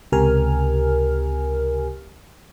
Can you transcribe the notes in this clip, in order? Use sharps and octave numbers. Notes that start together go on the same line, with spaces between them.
C#2 C3 G4 A#4 G#5 F6